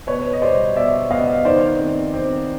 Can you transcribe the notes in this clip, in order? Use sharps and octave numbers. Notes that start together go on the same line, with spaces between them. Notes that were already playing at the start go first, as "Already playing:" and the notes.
B2 B4 C#5
D#5
G3 C5 D5
B2 D5 E5
B3 D#5 F5
D#3 C5 D5
C4
C4